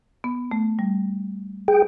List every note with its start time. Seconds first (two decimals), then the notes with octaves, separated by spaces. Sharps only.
0.24 B3
0.51 A3
0.79 G3
1.68 G#4 G5